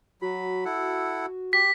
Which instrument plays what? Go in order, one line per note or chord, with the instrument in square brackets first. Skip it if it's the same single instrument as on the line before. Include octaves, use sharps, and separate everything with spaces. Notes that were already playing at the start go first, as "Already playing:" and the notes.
[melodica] F#3 B5 [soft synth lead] F#4
[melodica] E4 A4 F#5
[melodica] G4 [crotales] B6